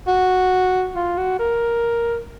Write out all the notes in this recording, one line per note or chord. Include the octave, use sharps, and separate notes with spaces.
F#4
F4
F#4
A#4